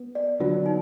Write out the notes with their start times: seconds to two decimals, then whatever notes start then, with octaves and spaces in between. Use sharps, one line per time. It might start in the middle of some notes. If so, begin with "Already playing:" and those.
Already playing: B3
0.15 D5
0.40 D3 F#3 B3 D4 F4
0.66 D#4